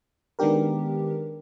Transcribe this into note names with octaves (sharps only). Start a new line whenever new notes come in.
D#3 G#3 B3 D4 G4 A#4